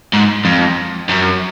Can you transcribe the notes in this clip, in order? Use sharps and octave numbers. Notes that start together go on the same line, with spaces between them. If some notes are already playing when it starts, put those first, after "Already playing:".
G#2
F2
F#2